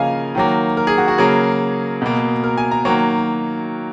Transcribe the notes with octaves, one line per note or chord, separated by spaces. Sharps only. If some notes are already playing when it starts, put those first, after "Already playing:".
Already playing: C#3 F3 A#3 D#5 F5 G#5
D#3 F#3 A#3
A#4
G#4
F#4
F#4
C#3 F#3 A#3 G#4
B2 A#3
A#4
G#5
A#5
D#3 F#3 A#3 C#5